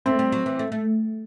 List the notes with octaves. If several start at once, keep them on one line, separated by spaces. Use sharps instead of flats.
A3 C4
G3
F#3
E3
A3
A3